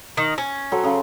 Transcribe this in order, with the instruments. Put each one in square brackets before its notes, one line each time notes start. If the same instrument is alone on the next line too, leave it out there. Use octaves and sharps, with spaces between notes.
[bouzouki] D#3
C#4
[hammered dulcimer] F#3 A4 C5
C#3 G#4